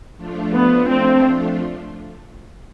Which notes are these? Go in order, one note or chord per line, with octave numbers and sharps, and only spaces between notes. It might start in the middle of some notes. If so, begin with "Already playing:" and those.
F3 A3 D4 F4
B3
C4